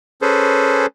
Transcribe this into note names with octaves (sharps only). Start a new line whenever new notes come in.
C#4 G#4 A4 B4 C5